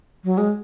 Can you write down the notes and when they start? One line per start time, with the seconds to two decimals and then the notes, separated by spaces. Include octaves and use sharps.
0.24 F#3
0.38 G#3